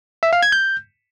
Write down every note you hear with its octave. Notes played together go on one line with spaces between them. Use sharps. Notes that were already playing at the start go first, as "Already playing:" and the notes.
E5
F5
G#6
G6